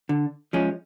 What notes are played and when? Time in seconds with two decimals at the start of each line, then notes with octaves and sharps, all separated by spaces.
0.09 D3
0.53 F3 G#3 C#4